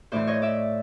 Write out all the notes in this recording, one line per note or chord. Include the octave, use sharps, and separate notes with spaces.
A2 E3 C5 D5
C#5 D#5
D5 E5